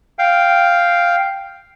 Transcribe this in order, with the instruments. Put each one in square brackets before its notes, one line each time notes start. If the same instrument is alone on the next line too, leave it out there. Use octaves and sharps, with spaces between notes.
[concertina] F5 G5